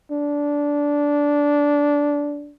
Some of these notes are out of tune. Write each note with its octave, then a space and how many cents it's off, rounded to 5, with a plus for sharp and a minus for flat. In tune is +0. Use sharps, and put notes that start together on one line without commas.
D4 -15